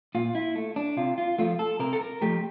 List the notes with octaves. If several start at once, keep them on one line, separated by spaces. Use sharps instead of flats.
A#2 F4
E4
A3
D4
C3 F4
F4
F3 A3 F4
A4
C3 A#4
A4
A#4
F3 A3 G4